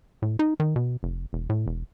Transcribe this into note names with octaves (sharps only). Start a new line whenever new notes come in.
A2
D#4
D#3
B2
F1
E1
A2
E1